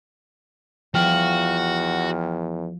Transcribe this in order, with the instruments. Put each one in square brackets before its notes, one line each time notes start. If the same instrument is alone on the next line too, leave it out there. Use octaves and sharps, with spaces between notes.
[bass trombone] E2 [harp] F3 [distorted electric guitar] F#4 [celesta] G5 F6